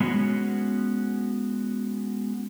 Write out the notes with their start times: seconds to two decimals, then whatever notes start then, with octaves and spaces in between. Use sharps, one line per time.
0.01 G#3 B3 C#4 F#4